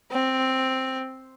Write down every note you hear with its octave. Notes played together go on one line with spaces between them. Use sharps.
C4